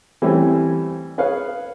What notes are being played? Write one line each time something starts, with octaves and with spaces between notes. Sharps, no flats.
E3 G3 A3 C4 C#4
G#4 B4 C#5 F5